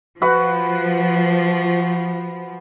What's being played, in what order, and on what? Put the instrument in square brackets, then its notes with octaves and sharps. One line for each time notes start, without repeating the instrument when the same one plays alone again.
[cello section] F3 [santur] F#4 B4 F#5